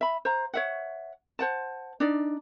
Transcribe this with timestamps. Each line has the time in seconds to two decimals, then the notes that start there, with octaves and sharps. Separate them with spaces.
0.01 E5 B5
0.25 C5 F5 A#5
0.54 C#5 E5 F#5
1.39 C5 F#5 A5
2.00 D4 D#4 D5